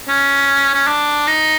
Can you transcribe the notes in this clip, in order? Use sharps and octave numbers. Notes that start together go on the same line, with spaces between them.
C#4
C#4
D4
D#4